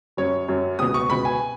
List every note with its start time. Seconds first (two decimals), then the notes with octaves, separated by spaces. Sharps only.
0.17 F#2 F#3 C#4 C#5
0.48 F#2 F#3 C#4
0.79 C#2 B2 B3 D#6
0.94 C#6
1.09 C#2 B2 B3 B5
1.25 G#5